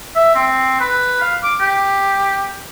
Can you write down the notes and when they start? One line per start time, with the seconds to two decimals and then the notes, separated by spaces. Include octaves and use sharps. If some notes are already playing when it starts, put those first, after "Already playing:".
0.16 E5
0.35 C4
0.80 B4
1.21 F5
1.43 D6
1.60 G4